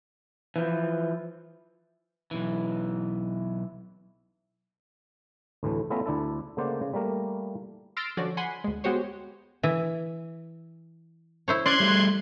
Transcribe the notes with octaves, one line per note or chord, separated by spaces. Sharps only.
E3 F3
B1 E3
D2 A2 E3 A3
A3 B3 C#4 F4 E5 A#5
D2 D4 E4 A4
C#3 A3 A#3 C5 D5 F#5
C#3
G3 A3 A#3 A#4
C6 E6 F6 A6 A#6 D7
D3 F3 C#4 F#4 D5
F#5 G#5 B5 C6
D2 G#3
G#3 B3 F#4 G4 C5 C#5
E3 E5
E4 C5 C#5
C#4 D5 C6 F#6 G#6
G3 A3